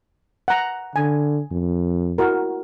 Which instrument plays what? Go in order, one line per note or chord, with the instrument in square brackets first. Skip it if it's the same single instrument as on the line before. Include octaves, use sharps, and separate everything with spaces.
[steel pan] F#5 A#5
[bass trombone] D3 [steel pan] G#5
[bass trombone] F2
[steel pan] E4 F#4 A#4